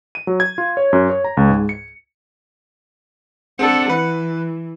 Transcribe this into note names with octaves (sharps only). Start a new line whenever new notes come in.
D#7
F#3
G#6
F4
C#5
F#2
C#5
A#5
C#2
G#2
C#7
C4 D4 A4 F#5
E3 B4